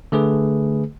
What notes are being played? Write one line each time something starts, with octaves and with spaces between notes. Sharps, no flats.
D3 A3 G#4 B4